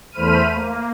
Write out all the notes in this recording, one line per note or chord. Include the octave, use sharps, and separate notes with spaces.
E2 A3 C5 B5 F6 D#7
A#3